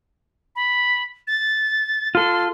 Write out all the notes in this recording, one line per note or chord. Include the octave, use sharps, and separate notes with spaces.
B5
A6
F4 A4 C6